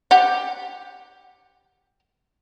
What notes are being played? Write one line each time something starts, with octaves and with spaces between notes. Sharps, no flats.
G4 F#5